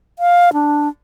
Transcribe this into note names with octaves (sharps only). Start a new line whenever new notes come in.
F5
D4